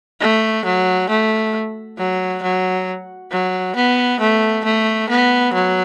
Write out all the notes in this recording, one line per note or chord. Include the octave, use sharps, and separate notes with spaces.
A3
F#3
A3
F#3
F#3
F#3
B3
A3
A3
B3
F#3